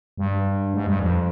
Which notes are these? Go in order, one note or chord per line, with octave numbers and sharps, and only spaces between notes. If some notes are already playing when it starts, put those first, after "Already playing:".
G2
G#2
G2
F2